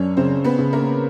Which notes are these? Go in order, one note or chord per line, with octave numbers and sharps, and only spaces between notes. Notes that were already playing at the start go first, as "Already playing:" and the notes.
Already playing: F#2 C#4 D4 C#5
C#3 C4 C5
B3 B4
C#3
A#3 A#4